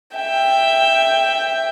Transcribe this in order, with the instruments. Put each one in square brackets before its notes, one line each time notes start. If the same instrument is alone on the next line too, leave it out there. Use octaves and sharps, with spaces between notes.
[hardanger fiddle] E5 G5